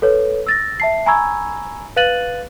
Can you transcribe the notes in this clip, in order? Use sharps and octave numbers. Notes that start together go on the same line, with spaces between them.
A4 B4 C#5
E6 A6 A#6
E5 A5 C7
G#5 A#5 B5 C#6 E6 G#6
B4 F5 F#6 A6 D#7 F#7